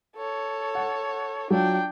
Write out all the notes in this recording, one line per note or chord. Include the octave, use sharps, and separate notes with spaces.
A4 C#5
F#5
F#3 D4 F4 G5